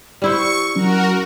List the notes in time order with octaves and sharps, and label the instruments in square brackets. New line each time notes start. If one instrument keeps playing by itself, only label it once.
[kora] G3 E4 C5 [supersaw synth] C#6
[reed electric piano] F#3 C#4 [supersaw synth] F#4 A#4